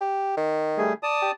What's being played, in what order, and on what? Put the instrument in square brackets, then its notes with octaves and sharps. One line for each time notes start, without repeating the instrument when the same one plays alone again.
[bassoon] G4
D#3
[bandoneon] G3 A3 G#4
D5 A5 D#6
[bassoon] G4